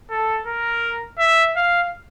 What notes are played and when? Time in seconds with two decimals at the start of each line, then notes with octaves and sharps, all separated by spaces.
0.11 A4
0.46 A#4
1.19 E5
1.56 F5